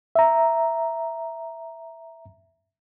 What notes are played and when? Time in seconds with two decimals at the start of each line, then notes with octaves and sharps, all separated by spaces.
0.15 E5 A#5